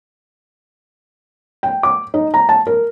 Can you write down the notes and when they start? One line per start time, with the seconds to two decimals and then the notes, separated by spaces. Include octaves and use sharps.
1.63 G5
1.83 D6
2.14 D#4
2.34 A#5
2.49 A5
2.67 A#4